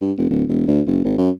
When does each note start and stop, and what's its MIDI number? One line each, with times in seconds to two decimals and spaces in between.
0.01 0.12 43
0.18 0.30 29
0.30 0.44 26
0.49 0.67 28
0.68 0.81 38
0.87 1.00 30
1.05 1.16 32
1.18 1.30 42